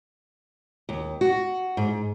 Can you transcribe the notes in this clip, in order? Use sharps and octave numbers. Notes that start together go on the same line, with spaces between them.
D#2
F#4
G#2